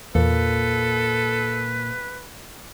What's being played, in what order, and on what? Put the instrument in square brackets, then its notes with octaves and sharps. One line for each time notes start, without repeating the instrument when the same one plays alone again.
[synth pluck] E2 [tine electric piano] A#2 A#3 [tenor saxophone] A4 [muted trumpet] B4